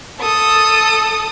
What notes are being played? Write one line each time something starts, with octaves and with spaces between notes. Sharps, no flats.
A4 D#6